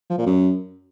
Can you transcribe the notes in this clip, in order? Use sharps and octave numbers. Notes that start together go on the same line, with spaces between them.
F3
A#2
F#2